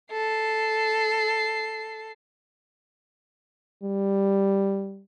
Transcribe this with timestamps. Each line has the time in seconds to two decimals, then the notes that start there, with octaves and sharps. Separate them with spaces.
0.12 A4 C7
3.83 G3